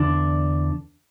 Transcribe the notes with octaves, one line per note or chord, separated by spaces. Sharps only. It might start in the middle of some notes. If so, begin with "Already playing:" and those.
Already playing: E2 D3 D4